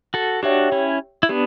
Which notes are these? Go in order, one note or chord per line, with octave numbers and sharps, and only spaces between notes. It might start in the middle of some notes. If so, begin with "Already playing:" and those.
F#4 A4
D4 F#4 G4 C#5 E5 G5
C#4 E4
E4
B3 D4 G4